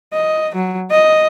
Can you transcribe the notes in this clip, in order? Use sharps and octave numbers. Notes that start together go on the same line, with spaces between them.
D#5
F#3
D#5